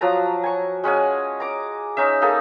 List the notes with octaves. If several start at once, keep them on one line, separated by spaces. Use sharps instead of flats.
F3 F#3 A5 A#5
G#5 C#6
G#3 C#4 F#5 G#5
A#5 D6
C#4 D#4 E5
A#3 D#4 G#4 A4